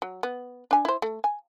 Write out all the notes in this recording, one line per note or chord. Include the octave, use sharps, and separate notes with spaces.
F#3
B3
D4 G#5
E4 C5
A3
G#5